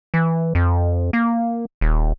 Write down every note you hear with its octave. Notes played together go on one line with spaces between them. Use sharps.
E3
F2
A#3
D#1